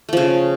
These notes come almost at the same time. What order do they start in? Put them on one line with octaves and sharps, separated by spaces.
A3 F3 C#3